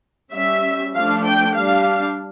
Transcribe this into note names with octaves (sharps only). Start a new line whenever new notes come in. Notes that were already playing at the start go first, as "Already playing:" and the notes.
G3 C#4 E5
F3 A3 D4 F5
G5
G3 D4 F5